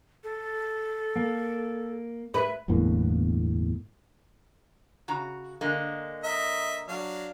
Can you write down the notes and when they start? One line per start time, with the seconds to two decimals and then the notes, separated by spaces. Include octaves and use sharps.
0.24 A4
1.16 A#3
2.34 B4 E5
2.68 G1 E2 A2 A#3
5.08 C#3 F#4 A#5
5.61 D3 G#3 A#3
6.24 A#4 D#5 E5
6.88 F#3 D4 F5